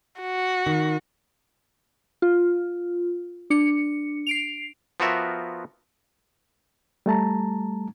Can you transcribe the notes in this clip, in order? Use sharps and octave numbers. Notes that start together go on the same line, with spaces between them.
F#4
D#3
F4
D4 C#7
C7 D7 F7
F3 B3 F4 F#4 A#4 E5
G3 A3 A5 A#5